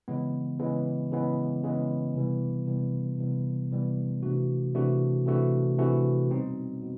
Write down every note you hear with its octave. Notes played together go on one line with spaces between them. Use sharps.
C#3 E3 G#3 B3
C#3 E3 G#3 B3
C#3 E3 G#3 B3
C#3 E3 G#3 B3
C3 E3 G3 B3
C3 E3 G3 B3
C3 E3 G3 B3
C3 E3 G3 B3
C3 E3 A3 D4 F#4
C3 E3 A3 D4 F#4
C3 E3 A3 D4 F#4
C3 E3 A3 D4 F#4
B2 G3 C4 D#4
B2